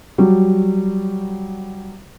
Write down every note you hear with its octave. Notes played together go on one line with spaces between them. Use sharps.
F#3 G3